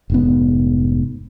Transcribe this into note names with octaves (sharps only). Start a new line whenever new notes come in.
F1 G#2 B3